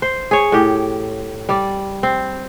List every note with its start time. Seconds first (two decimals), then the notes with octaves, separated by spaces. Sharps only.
0.02 C5
0.31 G#4 C#5
0.52 A2 G4
1.49 G3 D5
2.03 C4